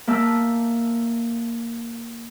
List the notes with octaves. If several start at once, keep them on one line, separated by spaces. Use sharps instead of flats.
A#3 E5 A5 E6 G6